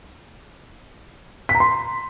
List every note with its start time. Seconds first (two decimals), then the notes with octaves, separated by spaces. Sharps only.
1.49 B6
1.55 A#5
1.60 C6